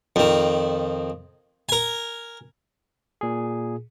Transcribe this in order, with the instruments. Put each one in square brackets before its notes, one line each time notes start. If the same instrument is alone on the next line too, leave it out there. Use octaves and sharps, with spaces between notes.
[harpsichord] F2 D#3
A#4 G#5
[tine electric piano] A#2 G#4